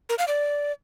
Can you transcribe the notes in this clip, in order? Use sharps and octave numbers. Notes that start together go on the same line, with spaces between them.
A#4
F5
D5